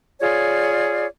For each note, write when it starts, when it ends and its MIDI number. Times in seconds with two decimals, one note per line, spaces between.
0.21 1.06 65
0.21 1.06 68
0.21 1.06 73
0.21 1.06 74